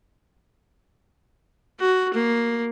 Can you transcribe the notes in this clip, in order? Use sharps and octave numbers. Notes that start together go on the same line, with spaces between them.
F#4
A#3